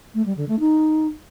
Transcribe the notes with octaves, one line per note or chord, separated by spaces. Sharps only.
A3
G3
D3
A3
D#4